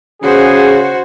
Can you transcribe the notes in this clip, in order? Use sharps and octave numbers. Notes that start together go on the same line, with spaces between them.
C#3 B3 F#4 G#4 C5